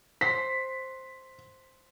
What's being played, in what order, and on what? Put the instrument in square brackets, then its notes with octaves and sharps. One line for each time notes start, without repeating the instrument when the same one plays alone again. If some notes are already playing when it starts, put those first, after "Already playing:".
[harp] C5 [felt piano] B6